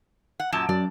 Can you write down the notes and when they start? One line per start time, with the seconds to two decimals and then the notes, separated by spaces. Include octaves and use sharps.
0.40 F#5
0.52 F#2 A#2 A5
0.69 F#2 D5